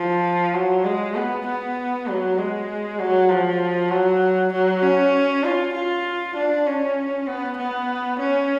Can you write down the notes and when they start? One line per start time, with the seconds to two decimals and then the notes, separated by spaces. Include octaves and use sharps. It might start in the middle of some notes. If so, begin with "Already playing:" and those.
Already playing: F3
0.54 F#3
0.85 G#3
1.16 B3
1.47 B3
2.08 F#3
2.38 G#3
3.00 F#3
3.30 F3
3.91 F#3
4.53 F#3
4.83 C#4
5.44 F4
5.74 F4
6.36 D4
6.66 C#4
7.27 B3
7.58 B3
8.19 C#4